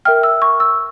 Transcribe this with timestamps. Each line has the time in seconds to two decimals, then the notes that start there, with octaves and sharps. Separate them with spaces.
0.05 A#4 E5 G5 F6
0.23 E6
0.42 C#6
0.60 E6